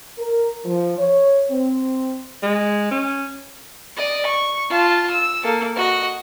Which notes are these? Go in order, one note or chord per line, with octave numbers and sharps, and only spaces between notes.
A#4
F3
C#5
C4
G#3
C#4
D5 D#5
C#6
F4 A5
E6
A#3 A4
F#4 D#5